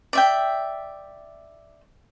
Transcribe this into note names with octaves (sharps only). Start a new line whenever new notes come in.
D5 E5 G5